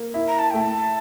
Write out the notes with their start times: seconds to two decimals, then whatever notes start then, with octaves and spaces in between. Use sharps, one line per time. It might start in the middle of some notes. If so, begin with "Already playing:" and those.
Already playing: A#3
0.14 E4
0.28 A#5
0.39 A5
0.51 A3 G5
0.61 A5